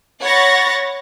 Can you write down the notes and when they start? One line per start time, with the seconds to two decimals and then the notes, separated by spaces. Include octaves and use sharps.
0.23 C#5 F#5 B5 C#6 A6 A#6